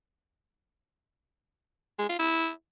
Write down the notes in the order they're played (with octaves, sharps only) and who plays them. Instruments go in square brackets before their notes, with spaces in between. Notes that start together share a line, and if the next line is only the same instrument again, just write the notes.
[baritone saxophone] G#3
F4
E4